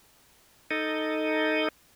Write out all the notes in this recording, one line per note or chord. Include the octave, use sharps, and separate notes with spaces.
D#4 A4 D#5